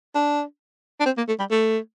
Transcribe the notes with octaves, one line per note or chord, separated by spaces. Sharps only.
D4
D4
C4
A#3
A3
G3
A3